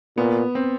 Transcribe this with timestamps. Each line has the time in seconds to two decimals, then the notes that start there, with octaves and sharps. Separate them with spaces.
0.17 A#2 B3
0.55 C4